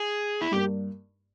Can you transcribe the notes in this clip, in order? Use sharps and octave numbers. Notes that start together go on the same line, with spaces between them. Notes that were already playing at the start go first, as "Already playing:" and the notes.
Already playing: G#4
E4
G2 G3 A#3 G4